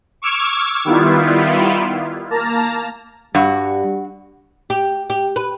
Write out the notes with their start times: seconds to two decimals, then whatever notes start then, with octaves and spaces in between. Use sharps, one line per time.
0.22 C#6 D6 E6 F6 G#6
0.85 D#3 G3 B3 E4 F4
2.30 A#3 A5 A#5
3.35 G2 G3 F#4
4.70 G4
5.10 G4
5.36 B4